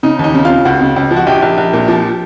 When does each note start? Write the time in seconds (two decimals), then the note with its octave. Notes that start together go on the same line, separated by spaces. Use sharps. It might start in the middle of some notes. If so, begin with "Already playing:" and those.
0.03 C#3 D#4
0.19 D#2 D#4
0.34 C#3
0.45 C#3 F4
0.65 C#2 F#4
0.81 C#3
0.96 C#2
1.11 F3
1.16 F#4
1.27 A#1 G4
1.42 A#1
1.58 A#1
1.73 A#2
1.88 F3